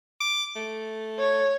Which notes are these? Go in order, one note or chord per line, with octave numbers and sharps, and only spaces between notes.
D6
A3
C#5